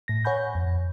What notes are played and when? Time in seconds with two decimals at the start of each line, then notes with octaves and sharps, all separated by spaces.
0.08 A2 A#6
0.25 C#5 F#5 G#5 B5 G6
0.55 F2